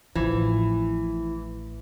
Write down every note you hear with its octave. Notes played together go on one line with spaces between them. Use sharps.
A1 A2 E3 F3